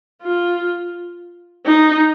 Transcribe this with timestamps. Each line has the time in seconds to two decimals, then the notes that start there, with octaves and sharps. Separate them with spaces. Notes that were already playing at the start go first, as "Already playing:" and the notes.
0.22 F4
1.66 D#4